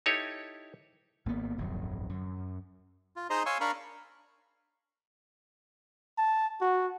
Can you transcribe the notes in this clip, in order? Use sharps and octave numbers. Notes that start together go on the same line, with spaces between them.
D#4 E4 G4 A4 C#5
G#1 A#3 B3
D1 G1 F2 F#3
F#2
F4
D#4 G#4 C5 D#5 A#5 C6
C#5 F5 G#5 C6 C#6 E6
D4 A#4 F5 A#5 B5 C#6
A5
F#4